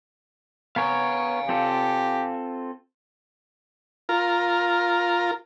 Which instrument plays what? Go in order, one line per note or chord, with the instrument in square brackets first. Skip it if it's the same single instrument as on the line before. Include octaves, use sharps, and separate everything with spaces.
[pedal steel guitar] B3 A#4 C#5 [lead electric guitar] F5 G#5
[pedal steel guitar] C4 F4 A4 [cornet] G4
[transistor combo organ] F4 A#4